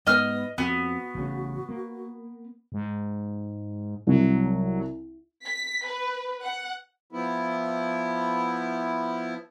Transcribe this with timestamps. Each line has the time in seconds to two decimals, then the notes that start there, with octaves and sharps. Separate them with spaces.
0.07 G#2 B3 D#5 F6
0.58 F2 B3 F#4
1.15 A1 C#3
1.69 A#3
2.72 G#2
4.07 C2 F#3
5.45 B6
5.84 B4
6.43 F#5
7.12 F3 B3 E4